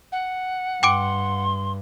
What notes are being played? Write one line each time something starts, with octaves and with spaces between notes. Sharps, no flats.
F#5
G2 G5 C6 D6 D7